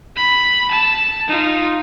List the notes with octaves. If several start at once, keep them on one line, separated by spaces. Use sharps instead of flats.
B5
A5
D#4 F4